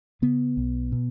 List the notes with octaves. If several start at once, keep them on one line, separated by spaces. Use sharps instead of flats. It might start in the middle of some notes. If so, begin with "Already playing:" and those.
C#3 B3
B1
B2